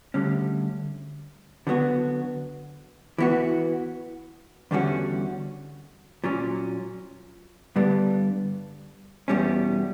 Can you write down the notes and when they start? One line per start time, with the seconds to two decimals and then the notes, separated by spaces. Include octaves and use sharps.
0.14 D2 D3 G3 C#4
1.67 D3 F#3 B3 F#4
3.18 E3 B3 F#4
4.71 E2 D3 G3 C#4 F#4
6.24 A#2 F#3 C#4
7.76 G2 D3 G3 B3 D4
9.28 E2 B2 G3 C#4